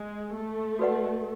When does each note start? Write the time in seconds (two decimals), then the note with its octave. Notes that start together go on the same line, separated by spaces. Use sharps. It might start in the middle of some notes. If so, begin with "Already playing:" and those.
Already playing: G#3
0.34 A3
0.79 F#4 B4 D5 F#5